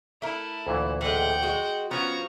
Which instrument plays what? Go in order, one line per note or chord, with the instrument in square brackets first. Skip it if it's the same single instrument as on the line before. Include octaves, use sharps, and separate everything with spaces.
[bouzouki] A3 A#4 [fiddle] E4
[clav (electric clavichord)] D2 A#2 E3
[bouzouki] A2 G#3 [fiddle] F#5 G5
[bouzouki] G#3 F#4
[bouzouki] F3 F#4 [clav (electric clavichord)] B3 C#4 [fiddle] A#5 C#6